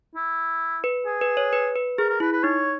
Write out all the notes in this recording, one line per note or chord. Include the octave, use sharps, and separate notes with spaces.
E4
B4
G#4
B4
C#5
B4
B4
G#4 A#4
A#4
E4 B4
B4
D#4 C#5